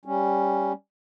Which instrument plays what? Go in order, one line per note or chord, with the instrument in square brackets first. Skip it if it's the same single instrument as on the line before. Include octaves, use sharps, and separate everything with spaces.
[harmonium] G3 C#4